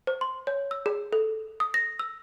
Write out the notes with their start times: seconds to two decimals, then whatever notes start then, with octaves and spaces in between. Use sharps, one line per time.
0.07 C5
0.21 C6
0.47 C#5
0.71 E6
0.86 G#4
1.13 A4
1.60 D#6
1.74 A#6
1.99 E6